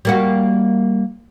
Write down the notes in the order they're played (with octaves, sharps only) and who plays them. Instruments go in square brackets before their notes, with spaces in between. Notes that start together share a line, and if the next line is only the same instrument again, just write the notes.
[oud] G3 A#3 F#4